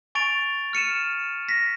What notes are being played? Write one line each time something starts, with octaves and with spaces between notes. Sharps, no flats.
G#5 C#6 A6 D7 F7
F6 C#7 D#7 E7
A#6 B6